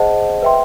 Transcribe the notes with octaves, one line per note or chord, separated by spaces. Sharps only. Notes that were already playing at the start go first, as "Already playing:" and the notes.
Already playing: G#4 C5 D#5 F#5 A5
B4 E5 G5 C6